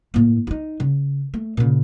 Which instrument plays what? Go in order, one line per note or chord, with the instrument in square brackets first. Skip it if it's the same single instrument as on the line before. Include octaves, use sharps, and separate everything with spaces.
[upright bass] A2 A#3
D#4 F4
C#3
A3
A#2 C#3